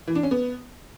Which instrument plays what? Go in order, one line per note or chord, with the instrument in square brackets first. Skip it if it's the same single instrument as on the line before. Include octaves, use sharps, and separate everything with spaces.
[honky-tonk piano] E3
D4
C#4
B3